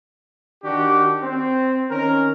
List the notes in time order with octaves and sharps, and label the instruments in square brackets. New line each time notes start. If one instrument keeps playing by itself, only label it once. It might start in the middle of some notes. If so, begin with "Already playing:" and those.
[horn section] D#3 D4 F#4 G4
C4
D#3 C#4 A#4